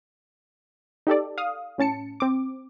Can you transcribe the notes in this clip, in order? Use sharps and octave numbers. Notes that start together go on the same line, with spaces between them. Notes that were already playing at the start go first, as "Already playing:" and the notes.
D#4 G4 A4 D5
F5 D#6
A2 C#4 A5 C#7
C4 D6